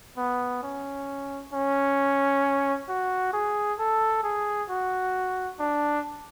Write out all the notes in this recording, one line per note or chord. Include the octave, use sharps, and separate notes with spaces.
B3
C#4
C#4
F#4
G#4
A4
G#4
F#4
D4